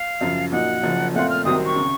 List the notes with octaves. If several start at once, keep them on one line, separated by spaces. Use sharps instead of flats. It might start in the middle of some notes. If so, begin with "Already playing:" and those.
Already playing: F5
F#2 C#3 F3
A#2 F#3 A#3 D#4 F#5
F#1 F#2 F3
A#2 A3 C4 F4 F#5
F6
C2 C3 D#3 F#3 C4 D#6
C#6
C#3